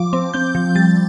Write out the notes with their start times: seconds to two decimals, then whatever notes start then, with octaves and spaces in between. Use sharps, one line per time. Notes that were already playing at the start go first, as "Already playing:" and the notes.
Already playing: F3 D6
0.13 C4
0.34 C4 G6
0.55 F3
0.75 G3 A6